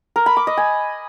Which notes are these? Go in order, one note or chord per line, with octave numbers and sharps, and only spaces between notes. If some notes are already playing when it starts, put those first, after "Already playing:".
A#4
B5
D6
D#5
G#5